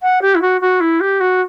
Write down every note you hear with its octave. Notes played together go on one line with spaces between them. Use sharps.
F#5
G4
E4
F#4
F#4
E4
G4
F#4